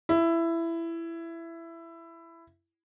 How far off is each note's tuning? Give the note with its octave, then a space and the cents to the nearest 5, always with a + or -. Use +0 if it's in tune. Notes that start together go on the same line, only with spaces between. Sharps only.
E4 +15